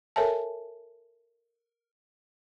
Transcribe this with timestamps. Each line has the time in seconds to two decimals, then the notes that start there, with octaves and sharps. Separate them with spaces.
0.16 A4 A#4 C#5 E5 G#5 A5